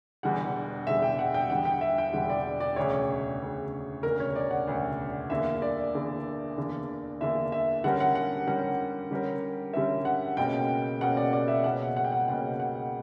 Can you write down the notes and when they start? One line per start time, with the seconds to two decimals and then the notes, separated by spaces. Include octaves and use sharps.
0.23 E1 E2 D3 G3 F#5
0.86 E1 E2 D3 G3 E5
1.02 G5
1.19 F#5
1.34 G5
1.50 E1 E2 D3 G3 F#5
1.65 G5
1.81 E5
1.98 G5
2.13 E1 E2 D3 G3 F#5
2.29 D5
2.60 D5
2.76 E1 D2 C#3 C#5
3.41 E1 D2 C#3
4.03 E1 D2 C#3 A#4
4.20 C#5
4.36 D5
4.51 F#5
4.67 E1 D2 C#3
5.30 E2 D3 A#3 E5
5.62 D5
5.94 E2 D3 A#3
6.57 E2 D3 A#3
7.20 E2 D3 A#3 E5
7.52 E5
7.84 D3 G3 C#4 G4 A#4 F#5
8.00 F#5
8.15 F#5
8.47 D3 G3 C#4 G4 A#4 F#5
9.11 D3 G3 C#4 G4 A#4
9.73 D3 G3 C#4 G4 A#4 E5
10.05 F#5
10.37 C#2 B2 A#3 C#4 G5
11.01 C#2 B2 A#3 C#4 F#5
11.17 D5
11.33 D5
11.48 E5
11.64 C#2 B2 A#3 C#4 F#5
11.96 F#5
12.04 G5
12.12 F#5
12.28 C#2 B2 A#3 C#4 F#5
12.60 F#5